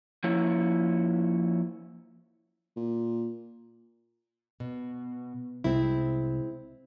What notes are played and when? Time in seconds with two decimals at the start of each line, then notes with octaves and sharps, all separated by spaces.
0.24 F3 A#3 C#4 E4 C#5
2.77 A#2
4.60 B2
5.64 C2 G#3 C4 E4